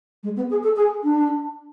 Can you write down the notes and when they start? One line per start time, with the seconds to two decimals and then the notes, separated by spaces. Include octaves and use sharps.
0.23 G#3
0.36 B3
0.50 G#4
0.63 A4
0.76 G#4
1.03 D4